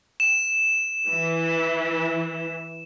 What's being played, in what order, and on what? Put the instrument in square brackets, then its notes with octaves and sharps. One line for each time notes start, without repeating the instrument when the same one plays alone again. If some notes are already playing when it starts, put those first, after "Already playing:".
[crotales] E7
[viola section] E3